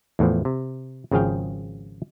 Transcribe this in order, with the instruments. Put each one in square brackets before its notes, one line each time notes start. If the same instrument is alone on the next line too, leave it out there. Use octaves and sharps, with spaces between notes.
[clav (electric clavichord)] E2 A2 E3 F3
C3
G#1 C#3 F3 G#4 F5 G5